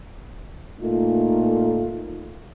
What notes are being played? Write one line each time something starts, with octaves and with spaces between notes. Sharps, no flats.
A#2 A3 D#4 F4